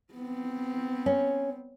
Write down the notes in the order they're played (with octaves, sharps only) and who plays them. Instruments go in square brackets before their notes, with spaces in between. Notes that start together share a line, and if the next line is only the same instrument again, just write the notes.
[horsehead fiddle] B3 C4
[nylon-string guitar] C#4